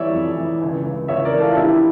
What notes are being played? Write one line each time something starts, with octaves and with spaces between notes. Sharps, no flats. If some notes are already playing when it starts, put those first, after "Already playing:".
Already playing: E3 G3 C#5 D5 E5
F2
E3
C#2
C#2
C#2 C#5 E5
A#4 D5
E3
F4 A4
A#1 E4 G4